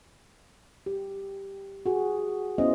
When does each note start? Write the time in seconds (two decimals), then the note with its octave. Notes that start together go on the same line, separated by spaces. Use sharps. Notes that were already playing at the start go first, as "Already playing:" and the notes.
0.86 G4
1.86 F#4 G#4
2.58 B3 C#4 E4 C5 D#5